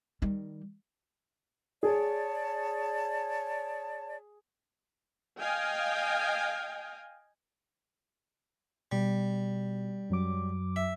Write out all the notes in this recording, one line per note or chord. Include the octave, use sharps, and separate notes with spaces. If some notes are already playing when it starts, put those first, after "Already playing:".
D#3 G3
G#4 C#5 D5 A5
D#5 F5 G5 G#5
B2 G3
F#2 F#3 D6
E5